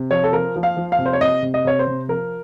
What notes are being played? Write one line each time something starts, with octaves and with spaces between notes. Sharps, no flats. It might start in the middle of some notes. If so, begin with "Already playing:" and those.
Already playing: C3
F3 C#5
A4
F3 A#4
F3
F5
F3
F5
C3
C5
C#5
C3 D#5
C3
D#5
C3 C#5
C5
C3
F3 A#4